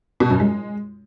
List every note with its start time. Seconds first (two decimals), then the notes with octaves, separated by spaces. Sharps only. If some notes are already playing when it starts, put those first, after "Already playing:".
0.20 B2
0.30 F#2
0.40 G#3